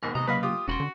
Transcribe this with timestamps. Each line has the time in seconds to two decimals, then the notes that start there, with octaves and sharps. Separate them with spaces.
0.03 D#2 G#2 B2 A#4
0.15 C3 D#5 A#5
0.27 C#3 F#3 A#3 B4 D#5 F5 B5
0.43 F4 G4 D#6
0.68 E1 C#4 F#4 B5 C6
0.80 D3